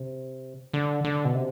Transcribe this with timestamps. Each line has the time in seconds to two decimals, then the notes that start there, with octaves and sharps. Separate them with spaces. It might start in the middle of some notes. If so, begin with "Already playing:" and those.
Already playing: C3
0.73 D3
1.05 D3
1.25 B2
1.34 C3